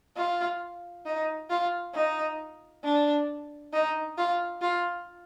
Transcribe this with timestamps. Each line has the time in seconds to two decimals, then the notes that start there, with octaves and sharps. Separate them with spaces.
0.17 F4
1.06 D#4
1.50 F4
1.95 D#4
2.84 D4
3.73 D#4
4.18 F4
4.62 F4